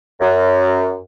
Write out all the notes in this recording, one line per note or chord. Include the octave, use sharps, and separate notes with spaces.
F#2